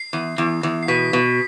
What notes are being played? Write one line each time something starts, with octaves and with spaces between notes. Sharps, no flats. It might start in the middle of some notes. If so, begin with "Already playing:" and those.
Already playing: C7
E2
E2
E2
C7
B2 B6
B2